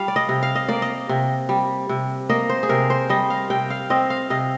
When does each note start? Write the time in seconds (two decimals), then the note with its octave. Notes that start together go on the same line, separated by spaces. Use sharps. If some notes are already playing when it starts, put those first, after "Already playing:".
Already playing: G3 F5
0.08 D5
0.16 D#5
0.29 C3
0.43 F5
0.55 D#5
0.68 A#3 D5
0.82 D#5
1.09 C3
1.49 G3
1.89 C3
2.29 A#3 D#5
2.49 C5
2.63 G#4
2.69 C3 A#4
2.90 C5
3.09 G3 D#5
3.30 F5
3.50 C3 G5
3.70 F5
3.90 C4 D#5
4.10 F5
4.30 C3 D#5